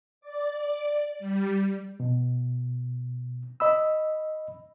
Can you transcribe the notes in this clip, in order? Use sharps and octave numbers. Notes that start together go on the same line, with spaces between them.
D5
G3
B2
D#5 B5 E6